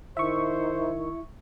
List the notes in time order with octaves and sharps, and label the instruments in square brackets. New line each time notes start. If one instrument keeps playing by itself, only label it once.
[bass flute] D#3 [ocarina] E4 [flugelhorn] C5 [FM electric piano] E5 C#6